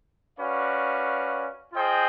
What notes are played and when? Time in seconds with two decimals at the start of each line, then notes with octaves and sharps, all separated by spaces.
0.38 C#4 F#4 B4 D5 F5
1.74 F4 G#4 C5 D#5 G5